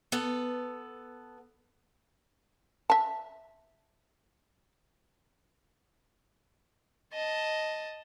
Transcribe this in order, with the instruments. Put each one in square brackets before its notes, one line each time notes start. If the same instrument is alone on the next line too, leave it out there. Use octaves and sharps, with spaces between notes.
[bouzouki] B3 A4
[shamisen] E5 A5
[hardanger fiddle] D#5 A5